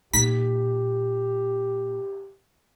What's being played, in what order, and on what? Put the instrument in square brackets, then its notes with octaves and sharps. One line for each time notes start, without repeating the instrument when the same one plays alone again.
[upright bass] A#2 [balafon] D#4 [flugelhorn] G4 [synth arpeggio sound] B6